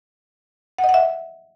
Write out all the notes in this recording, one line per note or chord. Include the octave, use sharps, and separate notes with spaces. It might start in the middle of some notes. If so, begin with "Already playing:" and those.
F#5
D#5
F#5
E5